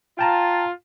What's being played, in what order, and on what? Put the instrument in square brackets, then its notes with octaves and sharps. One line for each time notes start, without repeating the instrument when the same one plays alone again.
[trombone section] F4 [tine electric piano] G5 A5 A#5